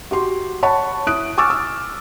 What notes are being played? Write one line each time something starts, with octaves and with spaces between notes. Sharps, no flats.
F#4 G4 C6
C#5 F#5 A5 B5 C#6
E4 D#6 F#6 D7
G#5 C#6 D6 E6 F6 A6
E6